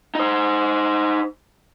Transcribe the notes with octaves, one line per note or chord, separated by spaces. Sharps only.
D#4 C5